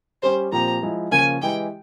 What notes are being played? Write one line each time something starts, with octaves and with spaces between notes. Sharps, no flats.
G3 C#4 G4 C5
A#2 F3 C4 G4 A#5
F3 G#3 E4
C#3 F3 A#3 C#4 F4 G#5
E3 G#3 E4 G4 G5